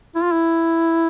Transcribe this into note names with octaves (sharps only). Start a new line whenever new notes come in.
E4
F4
E4